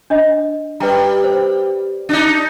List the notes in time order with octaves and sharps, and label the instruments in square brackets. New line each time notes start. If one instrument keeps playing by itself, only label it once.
[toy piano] D4 D#5
[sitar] G3 [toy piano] B4 G5 A#5
[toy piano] C5
[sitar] D4 D#4